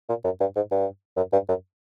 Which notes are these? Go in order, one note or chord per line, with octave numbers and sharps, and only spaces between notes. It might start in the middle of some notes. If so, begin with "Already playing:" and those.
A#2
F#2
G2
G#2
G2
F#2
G2
F#2